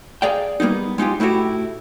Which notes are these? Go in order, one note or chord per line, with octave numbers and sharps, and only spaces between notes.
G#4 D5 F5 G5
G3 A#3 B3 D#4
G#3 D#4 F4 G4
A2 A3 E4 F#4 G4